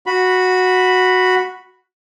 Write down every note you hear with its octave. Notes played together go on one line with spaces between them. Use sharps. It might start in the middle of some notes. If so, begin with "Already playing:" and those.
F#4 B5